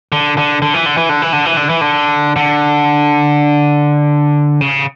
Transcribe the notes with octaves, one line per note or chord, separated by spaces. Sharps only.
D3
D3
D3
E3
D3
E3
D3
E3
D3
E3
D3
E3
D3
D3
C#3